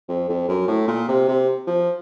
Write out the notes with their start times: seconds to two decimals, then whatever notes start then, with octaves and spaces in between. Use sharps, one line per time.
0.08 F2
0.29 F2
0.48 F#2
0.68 A2
0.88 A#2
1.08 C3
1.28 C3
1.67 F3